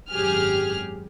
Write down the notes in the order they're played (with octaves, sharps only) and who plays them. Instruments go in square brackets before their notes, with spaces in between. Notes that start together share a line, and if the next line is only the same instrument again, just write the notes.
[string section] G#1 F#2 G4 G#4 F6